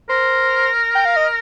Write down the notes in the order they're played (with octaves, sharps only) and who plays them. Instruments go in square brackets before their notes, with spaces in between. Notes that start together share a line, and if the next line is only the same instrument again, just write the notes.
[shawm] A#4 [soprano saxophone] C5
[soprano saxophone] G5
F5
D#5